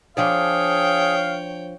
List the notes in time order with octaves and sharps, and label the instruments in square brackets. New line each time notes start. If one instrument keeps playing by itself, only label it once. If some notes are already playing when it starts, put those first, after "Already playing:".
[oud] F3 D4 D5 [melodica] G#4 [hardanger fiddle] C#5 G5 [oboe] F5